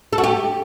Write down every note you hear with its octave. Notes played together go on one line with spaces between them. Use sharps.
A4
F#4
G4